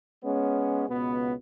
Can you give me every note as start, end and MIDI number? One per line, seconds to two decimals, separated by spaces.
0.24 0.85 56
0.24 0.85 59
0.24 0.85 61
0.89 1.32 37
0.89 1.32 47
0.89 1.32 59